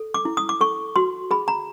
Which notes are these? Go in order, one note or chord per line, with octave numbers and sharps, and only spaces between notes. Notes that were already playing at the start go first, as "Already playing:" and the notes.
Already playing: A4
D6
E4
D#6
D6
A4 C#6
F#4 C6
G#4 B5
A#5